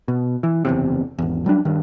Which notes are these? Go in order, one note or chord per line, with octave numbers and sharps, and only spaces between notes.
B2
E3
F#1 E2 C3
G#1 E2
F#3 G3 D4
G2 D#3